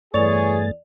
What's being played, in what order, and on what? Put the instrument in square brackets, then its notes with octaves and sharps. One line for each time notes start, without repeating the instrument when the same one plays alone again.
[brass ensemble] E2 G#4 [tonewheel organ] G2 A3 A6 [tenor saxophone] C#5 [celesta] D5 F7